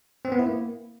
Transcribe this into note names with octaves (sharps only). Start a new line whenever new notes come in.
C4
B3
E4
A#3